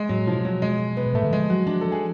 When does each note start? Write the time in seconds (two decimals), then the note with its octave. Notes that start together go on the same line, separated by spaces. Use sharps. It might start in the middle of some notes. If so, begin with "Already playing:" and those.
Already playing: G#3
0.09 A2 F#3
0.27 B2 F3
0.45 F#3
0.62 G#3
0.97 B3
1.06 B2
1.14 A2 A3
1.24 D3
1.32 F3 G#3
1.49 F#3 F#4
1.67 F3 D4
1.81 F3 A4
1.92 G#4